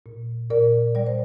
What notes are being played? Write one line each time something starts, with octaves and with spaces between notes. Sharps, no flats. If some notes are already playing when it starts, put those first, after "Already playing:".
A#2
A#2 A#4 D5
G3 D5
C5